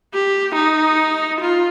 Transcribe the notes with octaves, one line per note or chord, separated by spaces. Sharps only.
G4
D#4
F4